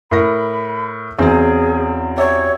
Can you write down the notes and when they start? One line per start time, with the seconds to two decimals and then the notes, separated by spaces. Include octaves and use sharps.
0.11 A2 A#4 B5 A#6
1.19 E2 C#3 F#3 C4 G#4
2.18 G4 C#5 D5 E5